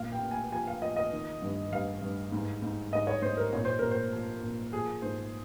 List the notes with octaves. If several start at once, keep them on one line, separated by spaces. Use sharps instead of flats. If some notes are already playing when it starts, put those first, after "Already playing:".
Already playing: A#2 F5
G5
A#2
G#5
F3 G#5
F5
F3 D#5
D#5
D#3
G2
G2 F5
G2
G#2
G#2
G#2 D#5
C#5
G#2 C5
A#4
A#2 C#5
C5
A#2 A#4
C5
F3
A#2
F3 G#4
G#2 C5